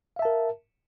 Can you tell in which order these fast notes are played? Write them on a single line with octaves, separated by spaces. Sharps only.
F5 E5 A5 A#4